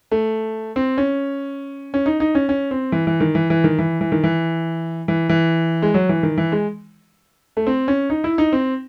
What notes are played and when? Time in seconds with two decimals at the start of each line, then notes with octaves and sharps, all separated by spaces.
0.12 A3
0.76 C4
0.98 C#4
1.94 C#4
2.06 D#4
2.20 D#4
2.35 C#4
2.49 C#4
2.71 C4
2.92 E3
3.07 E3
3.20 D#3
3.35 E3
3.50 E3
3.64 D#3
3.79 E3
4.01 E3
4.12 D#3
4.24 E3
5.08 E3
5.29 E3
5.82 G#3
5.94 F#3
6.09 E3
6.23 D#3
6.38 E3
6.52 G#3
7.57 A3
7.67 C4
7.88 C#4
8.10 D#4
8.24 E4
8.38 D#4
8.53 C4